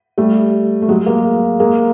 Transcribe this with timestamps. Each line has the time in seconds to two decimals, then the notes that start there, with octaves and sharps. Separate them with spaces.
0.18 G3 A3
0.82 A3
0.89 F#3 G#3
1.06 G#3 A#3
1.60 G#3 A#3